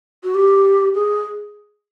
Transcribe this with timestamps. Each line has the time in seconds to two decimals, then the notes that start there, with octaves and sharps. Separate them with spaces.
0.24 F#4
0.35 G4
0.95 G#4